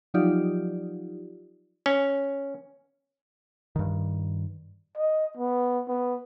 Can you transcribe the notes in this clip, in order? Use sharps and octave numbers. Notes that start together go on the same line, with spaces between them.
F3 F#3 D#4 F4 G4 D5
C#4
G2 D#3
D#5
B3
B3